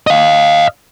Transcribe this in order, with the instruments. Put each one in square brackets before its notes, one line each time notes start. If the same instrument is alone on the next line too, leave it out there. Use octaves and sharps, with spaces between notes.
[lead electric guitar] D#5 F5